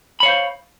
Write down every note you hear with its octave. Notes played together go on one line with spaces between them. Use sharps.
C5 C#5 F5 B5